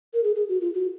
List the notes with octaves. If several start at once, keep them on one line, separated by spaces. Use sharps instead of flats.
A#4
G#4
G#4
F#4
F4
F#4